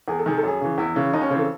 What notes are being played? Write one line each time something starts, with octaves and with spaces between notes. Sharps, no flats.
E2 G#4
A4
C3 D#3 G#4
A4
F#2 G#4
C#3 E3
E2 E4
C#3 E3
D#2 D#4
C#4
C#3 E3 C4 A4